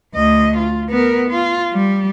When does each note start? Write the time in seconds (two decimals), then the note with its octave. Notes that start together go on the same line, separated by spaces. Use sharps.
0.14 D2 D#5
0.58 F4
0.90 B3 A#4
1.29 F4
1.72 G3